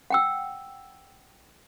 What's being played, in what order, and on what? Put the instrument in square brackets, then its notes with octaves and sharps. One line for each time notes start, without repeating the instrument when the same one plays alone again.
[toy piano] F#5 G5 E6